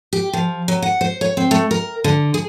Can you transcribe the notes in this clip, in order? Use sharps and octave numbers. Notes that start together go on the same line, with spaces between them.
G4
F3
F#3
F#5
C5
C#5
C4
A3
A#4
D3
G#4